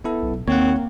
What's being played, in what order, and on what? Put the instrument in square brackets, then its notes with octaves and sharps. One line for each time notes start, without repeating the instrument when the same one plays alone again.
[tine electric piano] B3 E4 A4
[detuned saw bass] B1
[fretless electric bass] D#2 [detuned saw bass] A#3 [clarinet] C4 [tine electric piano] C#5 F#5